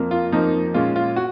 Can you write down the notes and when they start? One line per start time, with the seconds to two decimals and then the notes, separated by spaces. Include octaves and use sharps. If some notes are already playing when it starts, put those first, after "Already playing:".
Already playing: F2 F3 A#3
0.11 F4
0.32 F2 F3 A#3 D#4
0.74 A#2 G#3 C#4 F4
0.96 F4
1.16 F#4